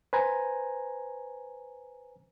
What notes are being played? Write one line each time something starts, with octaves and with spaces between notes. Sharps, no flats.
B4 C5 G#5 A#5